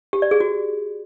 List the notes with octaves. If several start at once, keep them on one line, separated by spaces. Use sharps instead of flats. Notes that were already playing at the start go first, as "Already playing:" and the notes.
G4
D5
G#4
F#4